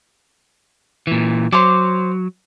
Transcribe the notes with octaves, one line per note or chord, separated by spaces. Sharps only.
A#2 E3
F#3 C5 C6 D6